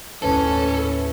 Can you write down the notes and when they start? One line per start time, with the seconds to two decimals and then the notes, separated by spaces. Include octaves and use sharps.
0.22 D#2 A2 E3 C#4 A4